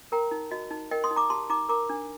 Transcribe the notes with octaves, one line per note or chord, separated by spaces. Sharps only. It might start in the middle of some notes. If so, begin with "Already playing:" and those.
A#4 G5 A#5
D#4
F#4 D#5
D#4
A#4 D#5 G5
C6 D#6
D#4
A#5 D6
G4 A5 C6
D#4 A#5 D6
A#4 A#5 D6
D4